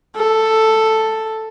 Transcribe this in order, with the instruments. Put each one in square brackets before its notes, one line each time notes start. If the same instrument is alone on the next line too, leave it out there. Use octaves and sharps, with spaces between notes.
[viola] A4